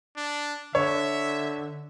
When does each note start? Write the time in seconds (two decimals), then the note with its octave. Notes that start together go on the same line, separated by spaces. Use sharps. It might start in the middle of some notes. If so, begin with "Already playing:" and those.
0.17 D4
0.75 D3 C#5 E5